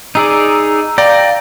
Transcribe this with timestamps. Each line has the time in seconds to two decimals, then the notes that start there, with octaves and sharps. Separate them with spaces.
0.15 D#4 G#4 D5 A#5 E6
0.98 D5 F5 G5 A#5